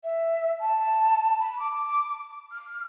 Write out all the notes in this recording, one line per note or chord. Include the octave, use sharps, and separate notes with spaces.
E5
A5
B5
D6
F6